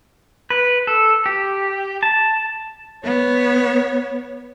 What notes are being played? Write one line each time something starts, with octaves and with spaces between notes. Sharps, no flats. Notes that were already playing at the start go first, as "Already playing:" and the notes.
B4
A4
G4
A5
B3 C#5